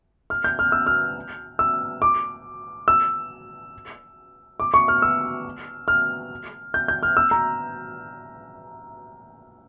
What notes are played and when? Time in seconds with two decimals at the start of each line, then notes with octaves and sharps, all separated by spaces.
0.30 F6
0.44 G6
0.59 F6
0.72 E6
0.87 F6
1.59 E6
2.02 D6
2.88 E6
4.60 D6
4.74 C#6
4.88 F6
5.02 E6
5.88 F6
6.74 G6
6.88 G6
7.03 F6
7.17 E6
7.31 A#5